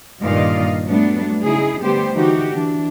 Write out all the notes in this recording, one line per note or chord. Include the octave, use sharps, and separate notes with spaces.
G2 A#2 D#3 D5 D#5 F5
F#3 G3 A3 B3 D4
C#3 D#4 E4 G#4
D3 G3 A3 B3 G4 C5
D3 E3 D#4 F#4 G4
E3 D4